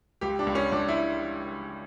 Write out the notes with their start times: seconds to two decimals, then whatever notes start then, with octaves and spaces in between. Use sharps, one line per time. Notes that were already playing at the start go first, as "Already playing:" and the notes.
0.21 C#2 G4
0.39 D4
0.47 C#2
0.55 C#4
0.72 C#2 D4
0.88 E4